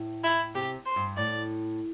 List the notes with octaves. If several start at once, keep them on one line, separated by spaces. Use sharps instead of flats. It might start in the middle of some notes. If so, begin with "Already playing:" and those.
Already playing: A2
E4
C3 G4
C5
G2
A2 D5